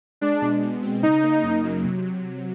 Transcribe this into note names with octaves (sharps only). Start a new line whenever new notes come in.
G#3 D4
B2
B2
C4
C#3 D#4
A#3
F#2
F#3
C3